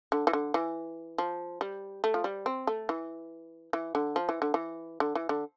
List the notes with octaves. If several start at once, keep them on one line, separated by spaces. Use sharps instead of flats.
D3
E3
D3
E3
F3
G3
A3
F3
G3
C4
A3
E3
E3
D3
F3
E3
D3
E3
D3
E3
D3